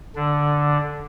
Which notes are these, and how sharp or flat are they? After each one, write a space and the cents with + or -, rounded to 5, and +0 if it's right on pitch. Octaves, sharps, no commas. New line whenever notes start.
D3 +0 D4 +0